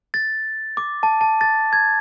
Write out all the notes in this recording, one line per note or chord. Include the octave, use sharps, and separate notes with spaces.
A6
D6
A5
A5
A6
G#6